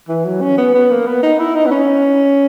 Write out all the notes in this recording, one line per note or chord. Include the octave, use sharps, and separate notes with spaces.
E3
F#3
C#4
B3
B3
A#3
B3
D#4
E4
D#4
B3
C#4